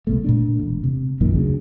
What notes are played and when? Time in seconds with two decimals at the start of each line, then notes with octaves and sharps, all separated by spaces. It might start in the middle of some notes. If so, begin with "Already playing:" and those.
0.07 C2 B2 A3
0.24 A#2 A3 D4
0.63 E1
0.84 C3
1.21 A#1 F#2 A#2 D#3
1.35 D2 C#3